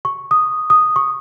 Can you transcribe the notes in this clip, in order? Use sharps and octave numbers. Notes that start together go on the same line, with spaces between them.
C#6
D#6
D#6
C#6